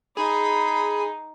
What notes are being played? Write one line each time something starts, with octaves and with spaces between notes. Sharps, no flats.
D#4 G#4 B5